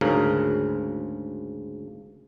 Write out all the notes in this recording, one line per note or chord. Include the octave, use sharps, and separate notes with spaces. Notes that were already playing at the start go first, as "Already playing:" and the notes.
D2 G#2 C#3 A#4